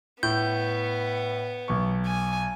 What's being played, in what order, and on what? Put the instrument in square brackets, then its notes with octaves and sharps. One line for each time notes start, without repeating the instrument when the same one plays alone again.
[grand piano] A2 [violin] B3 [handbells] G6
[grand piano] B1 C#6
[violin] G#5